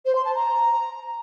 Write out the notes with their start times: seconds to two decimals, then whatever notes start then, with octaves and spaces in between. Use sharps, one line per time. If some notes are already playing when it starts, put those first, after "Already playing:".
0.06 C5
0.15 C6
0.25 A5
0.35 A#5